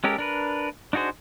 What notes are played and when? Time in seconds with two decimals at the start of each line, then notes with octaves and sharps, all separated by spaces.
0.04 G#3 C#4 G4 A4 A#4
0.18 D4 A#4 B4
0.93 D4 D#4 F#4 G#4 C5